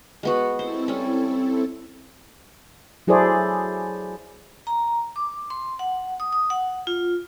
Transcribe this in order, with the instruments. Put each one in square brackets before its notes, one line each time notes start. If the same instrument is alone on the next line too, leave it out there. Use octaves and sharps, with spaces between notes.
[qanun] G#3 B3 F#4
[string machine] C4 E4 A4 [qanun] C5
[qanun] G3 C#4
[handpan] F#3 E4 G#4 A4 C5 D5
[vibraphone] A#5
D6
C6
F#5
D#6
D#6
F#5
F4